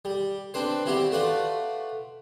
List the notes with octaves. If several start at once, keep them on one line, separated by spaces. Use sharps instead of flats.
G3
C4 D4 B4 C5
G3 C4 E4 F#4 G4
A3 F4 F#4 B4 D5